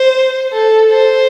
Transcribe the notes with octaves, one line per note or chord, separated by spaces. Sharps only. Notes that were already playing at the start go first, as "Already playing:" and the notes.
Already playing: C5
A4
C5